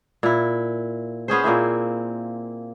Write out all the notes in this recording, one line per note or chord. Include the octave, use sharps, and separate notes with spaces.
A#2 E4
B3 C#4 G#4 C5
A#2 A#3 C4 E4